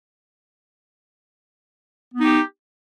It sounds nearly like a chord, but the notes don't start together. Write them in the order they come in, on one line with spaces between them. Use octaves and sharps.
B3 D#4 G4